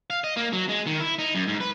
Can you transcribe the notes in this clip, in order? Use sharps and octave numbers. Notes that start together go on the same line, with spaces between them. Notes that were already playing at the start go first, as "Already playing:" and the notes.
F5
D#5
A#3
F#3
G#3
D#3
E4
D#4
F#2
G#2
B4